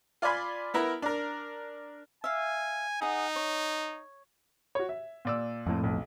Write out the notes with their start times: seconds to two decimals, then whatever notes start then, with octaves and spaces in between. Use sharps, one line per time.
0.22 F4 D5 G#5 B5 C6
0.74 B3 E4 A#4
1.02 D4 A#4
2.24 E5 F5 G#5
3.02 D#4 G#4 F#5
3.36 C#5
4.75 F#4 C#5
4.89 E5
5.25 A#2 D5 E6
5.67 F2 A2
5.83 B1